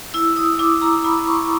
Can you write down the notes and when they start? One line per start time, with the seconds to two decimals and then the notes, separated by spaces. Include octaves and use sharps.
0.14 E4 E6
0.36 D#6
0.59 E4 D6
0.82 A#5
1.05 E4 B5
1.27 C#6